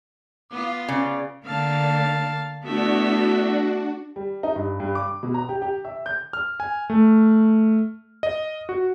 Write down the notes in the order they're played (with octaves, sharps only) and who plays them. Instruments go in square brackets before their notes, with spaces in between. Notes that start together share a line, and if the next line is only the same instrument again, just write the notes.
[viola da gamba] B3 F4 [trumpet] D6
[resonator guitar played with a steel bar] C#3 [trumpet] D5
[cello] D3 A#3 [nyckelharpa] F5 A5
[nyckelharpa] A3 E5 [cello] B3 E4 [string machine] D4 F#4
[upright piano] G3
D#4
G2
G2
D6
B2
A#5
G4
G4
E5
G6
[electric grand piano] F6
G#5
A3
D#5
F#4